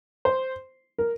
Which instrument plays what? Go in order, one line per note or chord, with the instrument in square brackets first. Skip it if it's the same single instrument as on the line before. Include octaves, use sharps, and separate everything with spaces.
[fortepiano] C5
A#4